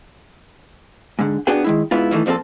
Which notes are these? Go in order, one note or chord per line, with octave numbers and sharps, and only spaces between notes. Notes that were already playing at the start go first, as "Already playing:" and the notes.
G#2 D3
B3 D4 F#4 G#4 G5
D#3 G#3 E4
G#2 B3 E4 F4
D#3 E3 G3 A3
A#2 F3 C4 F#4 A4